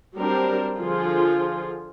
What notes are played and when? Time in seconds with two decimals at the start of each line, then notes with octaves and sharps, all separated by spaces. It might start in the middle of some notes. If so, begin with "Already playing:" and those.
0.16 F#3 G3 C4 D4 A#4 C5
0.76 D3 F3 F4 G#4